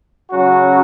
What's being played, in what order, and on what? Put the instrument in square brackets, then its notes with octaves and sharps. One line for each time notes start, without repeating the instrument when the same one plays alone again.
[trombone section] C#3 F#3 C#4 F#4